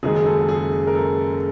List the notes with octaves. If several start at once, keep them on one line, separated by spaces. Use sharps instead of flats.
F#1 F#2 D#3 G#3 G#4
G#4
A4
G#4
A#4
A4